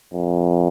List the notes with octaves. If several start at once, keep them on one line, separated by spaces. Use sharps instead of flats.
F2